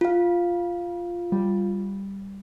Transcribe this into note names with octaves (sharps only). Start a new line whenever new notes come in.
F4 F5
G3